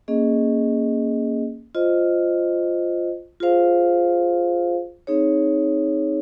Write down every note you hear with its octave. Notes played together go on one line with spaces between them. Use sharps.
A#3 C#4 G#4 D#5
F4 C5 D#5
F4 G#4 C5 F5
C4 D#4 G#4 C#5